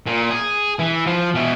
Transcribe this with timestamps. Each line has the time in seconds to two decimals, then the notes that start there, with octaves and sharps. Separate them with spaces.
0.06 A#2
0.30 G#4
0.79 E3
1.07 F3
1.35 B2 E3